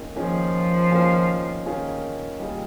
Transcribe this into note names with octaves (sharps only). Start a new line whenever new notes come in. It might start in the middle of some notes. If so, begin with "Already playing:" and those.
Already playing: D#3 A#3 C#4 F4 G#4
D#3 F3 A#3 C#4 F4 G#4
D#3 A#3 C#4 F4 G#4
D#3 A#3 C#4 F4 G#4
D#3 G3 A#3 F4 G#4